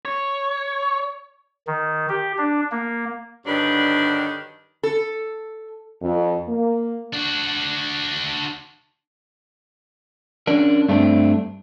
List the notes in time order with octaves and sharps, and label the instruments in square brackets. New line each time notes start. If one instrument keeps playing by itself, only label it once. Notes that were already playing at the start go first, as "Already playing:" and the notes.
[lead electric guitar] C#5
[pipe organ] D#3
G4
D4
A#3
[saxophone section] G2 D3 D#3 F#3 D4 B4
[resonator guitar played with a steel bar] A4
[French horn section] F2
A#3
[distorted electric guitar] D4 F#4
[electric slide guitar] C#4 D4 A#4
G2 A3 C4 D4